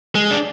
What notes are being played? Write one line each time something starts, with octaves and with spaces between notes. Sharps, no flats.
G#3
D4